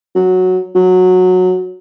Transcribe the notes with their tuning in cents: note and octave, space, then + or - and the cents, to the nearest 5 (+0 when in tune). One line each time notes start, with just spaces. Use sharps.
F#3 -5
F#3 -15